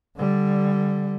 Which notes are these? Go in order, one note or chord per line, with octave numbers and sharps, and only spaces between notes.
D3 G3